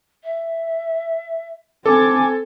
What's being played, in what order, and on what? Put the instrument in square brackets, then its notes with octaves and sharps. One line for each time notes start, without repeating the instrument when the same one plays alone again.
[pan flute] E5
[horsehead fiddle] C4 G#5 [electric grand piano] A4 [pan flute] D6